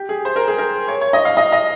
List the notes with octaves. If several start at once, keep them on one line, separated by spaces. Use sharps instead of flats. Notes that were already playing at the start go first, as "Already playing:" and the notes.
Already playing: G4
G#4
C5
A#4
G#4
A#4
C#5
C#5
D#5
F5
D#5
D#5